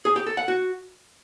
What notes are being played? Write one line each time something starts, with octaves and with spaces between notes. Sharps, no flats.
G#4
G4
A4
F#5
F#4